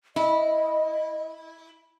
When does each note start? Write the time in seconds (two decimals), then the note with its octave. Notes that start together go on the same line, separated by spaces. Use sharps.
0.16 E4 D#5